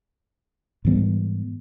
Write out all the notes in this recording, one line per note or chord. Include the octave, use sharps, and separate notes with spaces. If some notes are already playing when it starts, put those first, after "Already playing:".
G#2 E3 G3 B3